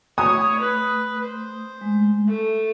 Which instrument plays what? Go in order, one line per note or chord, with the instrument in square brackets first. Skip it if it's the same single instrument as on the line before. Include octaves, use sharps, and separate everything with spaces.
[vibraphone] A3 [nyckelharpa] E4 C#5 [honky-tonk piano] D#6
[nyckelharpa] B4
C5
[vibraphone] G#3 A3
[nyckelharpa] A3 [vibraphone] E5